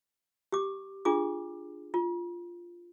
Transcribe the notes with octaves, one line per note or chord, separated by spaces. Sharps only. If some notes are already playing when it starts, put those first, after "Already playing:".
G4 D6
D4 F4 G#4 D6
F4